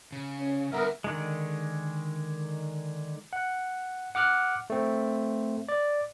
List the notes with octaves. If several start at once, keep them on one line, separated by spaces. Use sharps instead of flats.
C#3
C#4
D3 G3 B3 A#4 B4 E5
D3 D#3 G#3
F#5
F#5 D6 F6 F#6
A3 C4
D5